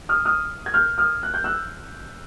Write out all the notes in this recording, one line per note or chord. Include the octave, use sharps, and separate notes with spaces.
D#6 F6
D#6 F6
G#6
F6 G6
D#6 F6
F#6
G6
E6 F#6